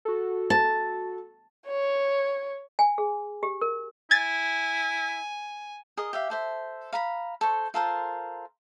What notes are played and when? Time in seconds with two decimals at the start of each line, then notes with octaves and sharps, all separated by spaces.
0.05 F#4 A4
0.50 A5
1.67 C#5
2.79 G#5
2.98 G#4
3.43 G4
3.61 A#4
4.11 E4 G#5 G#6 A6
5.97 G#4 A#4 D#5
6.13 G4 E5 F5
6.30 A4 C5 E5
6.93 F5 A#5 B5
7.41 A4 C5 C#6
7.74 F4 A4 A#4 C5